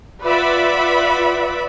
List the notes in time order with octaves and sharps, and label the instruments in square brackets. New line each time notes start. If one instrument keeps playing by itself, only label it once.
[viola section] F4 B4 D5 E5 F#5 B5